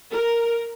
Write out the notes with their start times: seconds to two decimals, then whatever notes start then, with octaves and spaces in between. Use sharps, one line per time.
0.12 A#4